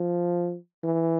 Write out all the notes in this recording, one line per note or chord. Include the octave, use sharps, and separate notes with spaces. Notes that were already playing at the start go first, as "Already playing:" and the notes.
Already playing: F3
E3